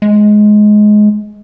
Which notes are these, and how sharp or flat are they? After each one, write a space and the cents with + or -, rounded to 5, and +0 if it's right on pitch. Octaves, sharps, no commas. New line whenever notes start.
G#3 +15